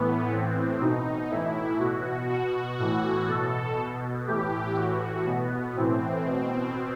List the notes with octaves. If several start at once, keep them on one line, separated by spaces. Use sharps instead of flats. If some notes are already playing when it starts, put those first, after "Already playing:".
Already playing: A2 E3 B3
A2 E3 C4
B2 D#4
A2 E3 E4
B2 F#4
B2 F#4
A2 E3 F#4
B2 A4
B2
A2 E3 G4
A2 E3 F#4
B2 B3
A2 E3 C4
B2